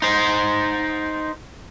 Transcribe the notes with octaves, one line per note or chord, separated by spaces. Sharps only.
D#4 C5